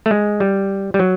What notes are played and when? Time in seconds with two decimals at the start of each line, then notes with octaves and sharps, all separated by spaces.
0.06 A3
0.11 G#3
0.40 G3
0.94 G3
1.00 F#3